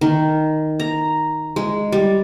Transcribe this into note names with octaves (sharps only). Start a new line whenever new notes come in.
D#3
A#5
G#3
G3